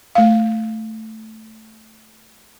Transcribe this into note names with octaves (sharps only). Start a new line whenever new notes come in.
A3 F5